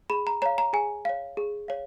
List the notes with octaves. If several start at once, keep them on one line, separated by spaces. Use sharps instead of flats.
G#4 B5
A#5
C#5 F5 A#5
A#5
G#4 G#5
C#5 F5
G#4
C#5 F5